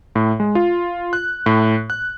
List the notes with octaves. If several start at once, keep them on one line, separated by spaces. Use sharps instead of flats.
A2
G#3
F4
F#6
A2
F#6